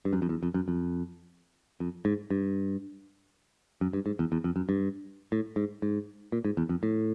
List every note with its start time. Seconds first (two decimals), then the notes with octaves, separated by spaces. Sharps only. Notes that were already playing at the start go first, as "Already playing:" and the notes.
0.05 G2
0.13 F#2
0.22 F2
0.29 E2
0.43 F2
0.54 F#2
0.68 F2
1.80 F2
2.05 G#2
2.30 G2
3.81 F#2
3.93 G2
4.06 G#2
4.19 E2
4.32 E2
4.44 F2
4.56 F#2
4.69 G2
5.32 A2
5.56 G#2
5.82 G#2
6.32 A#2
6.45 G#2
6.57 E2
6.69 F2
6.83 A2